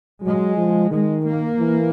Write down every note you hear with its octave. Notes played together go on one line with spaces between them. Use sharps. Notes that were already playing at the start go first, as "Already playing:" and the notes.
F#3 G#3
F3
D#3 G#3
A#3
E3